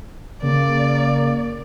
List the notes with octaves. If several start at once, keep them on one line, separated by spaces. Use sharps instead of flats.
C#3 A#3 D5